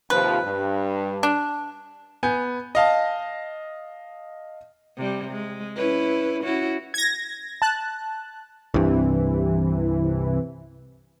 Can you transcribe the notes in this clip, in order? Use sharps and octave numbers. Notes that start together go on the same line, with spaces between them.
D#2 C3 F3 B4
G2
D4
B3 G#5 G6
D#5 F5 A5
C3 G3
G#3
C#4 E4 B4
C#4 E4 F#4
G#6 A#6
A5 F#6
C2 G2 C3 E3